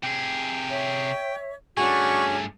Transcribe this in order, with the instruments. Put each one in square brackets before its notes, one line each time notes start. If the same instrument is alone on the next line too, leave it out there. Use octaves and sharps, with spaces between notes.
[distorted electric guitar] C3 G#4 [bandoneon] G5
[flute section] C#5 E5
[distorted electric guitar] G2 A3 [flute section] C#4 D4 F#4 [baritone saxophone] G#4 [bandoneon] C#6